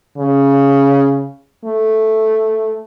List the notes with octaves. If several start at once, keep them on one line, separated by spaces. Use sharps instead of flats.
C#3
A3